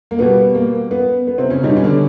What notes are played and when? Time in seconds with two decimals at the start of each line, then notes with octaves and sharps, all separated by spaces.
0.11 A#3
0.19 B2 G3 B3
0.55 A#3
0.91 B3
1.27 B3
1.38 C3 C4
1.50 C#3 C#4
1.62 B2 G3 D#4
1.70 D4
1.77 C#4
1.84 D3 D4